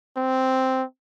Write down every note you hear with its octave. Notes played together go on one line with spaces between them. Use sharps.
C4